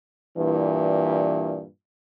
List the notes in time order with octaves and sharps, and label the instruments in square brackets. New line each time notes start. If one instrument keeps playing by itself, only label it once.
[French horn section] G2 A#2 E3